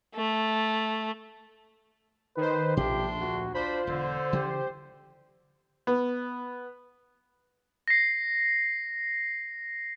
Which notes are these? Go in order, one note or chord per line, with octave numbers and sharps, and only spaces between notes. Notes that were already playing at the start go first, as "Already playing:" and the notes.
A3
D#3 B4 C5
A#1 B2 F3 A3 D4 G4 C6
D2 F#4
D4 F4 C5 B5
E1 D3
C#3 E3 F3 G4
B3
A#6 C7